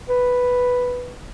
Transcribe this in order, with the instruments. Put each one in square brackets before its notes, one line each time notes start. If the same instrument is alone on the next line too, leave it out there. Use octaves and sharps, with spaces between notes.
[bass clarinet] B4